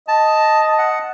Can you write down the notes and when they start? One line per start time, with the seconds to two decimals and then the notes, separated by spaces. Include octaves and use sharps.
0.08 D#5 A5
0.78 F#5